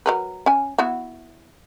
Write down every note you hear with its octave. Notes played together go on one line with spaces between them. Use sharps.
F#3 A#4 B4
C#4 G#5
B3 E4 F#4